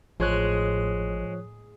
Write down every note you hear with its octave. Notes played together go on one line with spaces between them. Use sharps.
A1 A2 F3 G#3 C#5 F#6